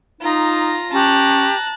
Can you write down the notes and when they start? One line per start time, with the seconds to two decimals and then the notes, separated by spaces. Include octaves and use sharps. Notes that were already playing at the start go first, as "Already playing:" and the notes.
0.21 D#4 F4 A#5
0.93 C#4 G4 A5 A#5 F#6